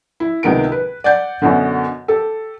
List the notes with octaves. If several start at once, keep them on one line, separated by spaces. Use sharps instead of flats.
E4
C#2 C3 D#3 B3 D7
B4
D5 F#5 G6
F#2 B2 D3
G4 A4